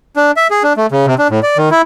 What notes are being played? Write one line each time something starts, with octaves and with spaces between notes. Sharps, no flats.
D4
E5
G#4
D4
A3
C#3
C3
D4
A2
D5
D#3
E4